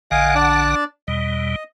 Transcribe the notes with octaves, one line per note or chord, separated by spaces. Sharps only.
A#1 D3 D#5 F5 F#5 G#5
D4 D5 A5
E2 B2 G3 D#5